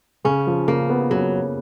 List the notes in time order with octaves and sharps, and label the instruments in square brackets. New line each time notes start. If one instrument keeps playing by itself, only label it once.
[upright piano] C#3 [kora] C#4
[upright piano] F3
[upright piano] C#3 [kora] A#3
[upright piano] B3
[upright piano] C#3 [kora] F#3